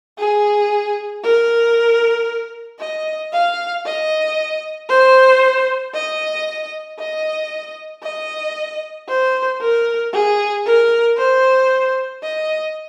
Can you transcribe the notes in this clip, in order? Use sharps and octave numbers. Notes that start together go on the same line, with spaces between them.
G#4
A#4
D#5
F5
D#5
C5
D#5
D#5
D#5
C5
A#4
G#4
A#4
C5
D#5